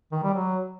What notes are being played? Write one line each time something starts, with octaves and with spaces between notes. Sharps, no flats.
D#3
G3
F#3